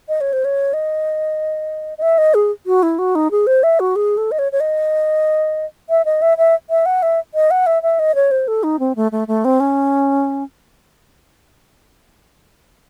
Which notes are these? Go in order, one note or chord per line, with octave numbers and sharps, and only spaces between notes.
D#5
C#5
C5
C#5
D#5
D#5
E5
D#5
G#4
F#4
E4
F#4
D#4
G#4
C5
E5
F#4
G#4
A4
D#5
C#5
C#5
D#5
E5
D#5
E5
E5
E5
F#5
E5
D#5
F#5
E5
E5
D#5
C#5
C5
A4
D#4
C4
A3
A3
A3
C4
C#4